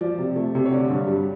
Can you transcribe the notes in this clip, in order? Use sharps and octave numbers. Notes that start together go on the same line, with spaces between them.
F3 D5
C3
A3
C3
C#5
D3 D5
G2
G3